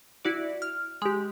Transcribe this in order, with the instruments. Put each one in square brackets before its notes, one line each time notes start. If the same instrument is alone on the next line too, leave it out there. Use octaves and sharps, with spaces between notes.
[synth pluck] E4 F#4 D5
F6
G#3 G4